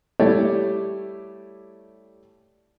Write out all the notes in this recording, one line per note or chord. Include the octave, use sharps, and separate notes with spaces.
G3 A3 E4 G4 C#5 D5